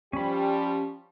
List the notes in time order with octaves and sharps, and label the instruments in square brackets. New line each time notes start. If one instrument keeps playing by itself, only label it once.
[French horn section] F3 G3 G4 [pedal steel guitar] C#4 B5